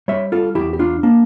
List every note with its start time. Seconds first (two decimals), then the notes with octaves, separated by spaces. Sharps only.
0.08 G3 C#5 E5
0.32 F4 A4
0.55 E2 E4 G4
0.73 G4
0.79 D4 F4
1.03 A#3 D4